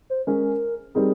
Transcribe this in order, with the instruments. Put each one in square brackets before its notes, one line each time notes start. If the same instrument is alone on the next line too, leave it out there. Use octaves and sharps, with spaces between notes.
[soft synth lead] C5
[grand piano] G#3 C#4 G#4 [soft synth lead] A#4
[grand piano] G3 C4 D#4 A#4 [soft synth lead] G#4